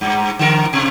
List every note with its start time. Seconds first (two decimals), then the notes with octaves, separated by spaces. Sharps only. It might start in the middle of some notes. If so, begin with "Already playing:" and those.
0.01 G2
0.39 D3 A#4
0.73 B2